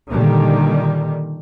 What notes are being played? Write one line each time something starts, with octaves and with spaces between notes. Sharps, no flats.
A#2 D3 D#3 G3